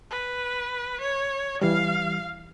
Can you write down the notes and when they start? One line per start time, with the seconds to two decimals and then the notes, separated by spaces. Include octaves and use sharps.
0.10 B4
1.01 C#5
1.62 E3 G3 F5